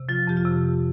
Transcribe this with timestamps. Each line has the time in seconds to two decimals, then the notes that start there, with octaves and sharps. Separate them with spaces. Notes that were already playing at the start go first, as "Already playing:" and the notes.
Already playing: C3
0.09 F3 F4
0.27 F2 G4
0.37 F4
0.45 C3